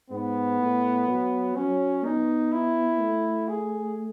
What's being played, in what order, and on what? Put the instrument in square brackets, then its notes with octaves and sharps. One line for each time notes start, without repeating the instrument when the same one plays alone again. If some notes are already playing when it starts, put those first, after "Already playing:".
[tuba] G#2 [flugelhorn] B3
[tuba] A2
F#3
[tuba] F#3 [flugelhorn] C#4
[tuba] B3 [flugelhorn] D#4
[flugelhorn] E4
[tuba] A3
[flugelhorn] G#4